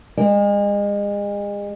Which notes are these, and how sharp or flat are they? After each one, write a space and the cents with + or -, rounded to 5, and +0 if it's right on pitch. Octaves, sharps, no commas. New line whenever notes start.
G#3 -35